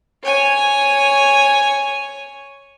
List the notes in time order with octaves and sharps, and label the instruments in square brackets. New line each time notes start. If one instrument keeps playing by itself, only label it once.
[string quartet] C#5 G#5